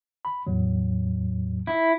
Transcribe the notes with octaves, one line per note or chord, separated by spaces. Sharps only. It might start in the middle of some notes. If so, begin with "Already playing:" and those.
B5
E2 A2 F#3
E4